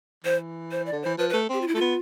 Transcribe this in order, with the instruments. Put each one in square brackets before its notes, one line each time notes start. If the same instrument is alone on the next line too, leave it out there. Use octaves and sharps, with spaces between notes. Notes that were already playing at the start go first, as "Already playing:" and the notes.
[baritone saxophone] E3 [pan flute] C5
[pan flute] C5
D5
[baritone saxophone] D3
[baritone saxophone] E3 [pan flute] C5
[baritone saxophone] F3 [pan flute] B4
[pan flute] B4
[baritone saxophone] A3
[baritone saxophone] C4 [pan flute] G4
[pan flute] F4
E4
[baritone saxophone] A3 [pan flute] F4
[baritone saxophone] B3